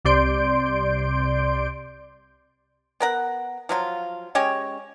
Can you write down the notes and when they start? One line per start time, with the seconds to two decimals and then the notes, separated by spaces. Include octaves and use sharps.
0.05 C2 C3 D5 C6 G6 D7
3.00 B3 A#4 F#5
3.69 F3 F#3 F4
4.35 G#3 C#4 G4 C#5